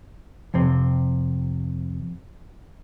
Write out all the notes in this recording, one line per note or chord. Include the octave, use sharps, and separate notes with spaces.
F2 C3 C4